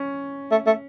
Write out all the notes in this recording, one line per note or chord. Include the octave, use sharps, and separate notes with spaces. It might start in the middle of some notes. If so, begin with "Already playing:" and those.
Already playing: C#4
A3
A3